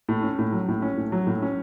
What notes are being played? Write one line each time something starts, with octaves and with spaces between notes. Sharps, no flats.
A2
C#4
A2
F#3
A2
C#4
A2
F#3
A2
C#4